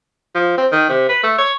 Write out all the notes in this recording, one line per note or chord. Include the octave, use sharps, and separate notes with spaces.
F3
C4
D#3
C3
B4
A3
C#5